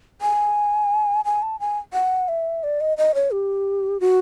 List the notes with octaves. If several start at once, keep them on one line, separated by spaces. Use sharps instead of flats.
G#5
G#5
A5
G#5
F#5
E5
D5
D#5
D#5
C#5
G4
F#4